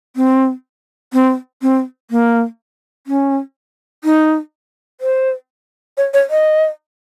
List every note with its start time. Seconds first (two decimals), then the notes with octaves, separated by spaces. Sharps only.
0.16 C4
1.13 C4
1.62 C4
2.11 A#3
3.07 C#4
4.04 D#4
5.01 C5
5.97 C#5
6.14 C#5
6.30 D#5